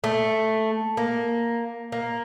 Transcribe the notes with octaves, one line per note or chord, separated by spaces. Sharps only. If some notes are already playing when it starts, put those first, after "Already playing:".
A3
A#3
A#3